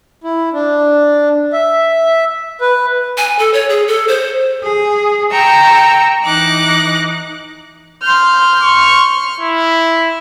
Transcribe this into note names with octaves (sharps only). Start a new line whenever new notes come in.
E4
D4
E5
B4
G#5
A4
C#5
G#4
A4
C5
G#4
G5 A#5 C#6 E6
E3 D#4 D6 F#6 A#6
C6 F6 G6
C#6
E4